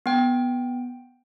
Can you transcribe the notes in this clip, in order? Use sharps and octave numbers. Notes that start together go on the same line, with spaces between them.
B3 G5